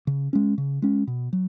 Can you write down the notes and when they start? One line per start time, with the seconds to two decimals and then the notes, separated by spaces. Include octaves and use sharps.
0.07 C#3
0.33 G#3 C#4
0.58 C#3
0.82 G#3 C#4
1.07 B2
1.33 F#3